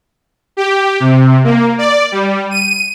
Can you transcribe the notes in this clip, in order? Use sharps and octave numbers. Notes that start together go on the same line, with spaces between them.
G4
C3
A#3
D5
G3
D#7